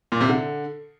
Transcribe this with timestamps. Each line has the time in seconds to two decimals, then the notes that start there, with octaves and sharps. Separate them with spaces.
0.12 A#2
0.21 C3
0.29 D3